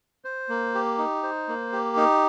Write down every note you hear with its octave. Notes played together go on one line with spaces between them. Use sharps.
C5
A#3
G4
D#4
C5
A#3
G4
D#4